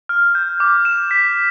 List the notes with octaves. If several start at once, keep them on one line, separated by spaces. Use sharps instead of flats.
F6
G6
D6
E7
B6